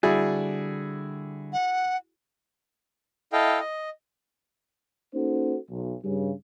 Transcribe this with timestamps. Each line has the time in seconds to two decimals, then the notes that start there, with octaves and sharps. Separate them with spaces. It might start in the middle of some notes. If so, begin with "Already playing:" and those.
0.03 D3 G3 E4 F#4 G#4 D5
1.53 F#5
3.33 E4 A4 D#5 F5 G5
3.60 D#5
5.15 A#3 C#4 D#4 F#4 A4 C5
5.70 B1
6.04 G2 C#3